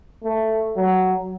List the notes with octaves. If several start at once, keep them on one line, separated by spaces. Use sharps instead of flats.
A3
F#3